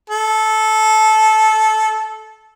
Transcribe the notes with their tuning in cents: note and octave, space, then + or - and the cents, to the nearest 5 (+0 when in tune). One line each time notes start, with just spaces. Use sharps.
A4 -15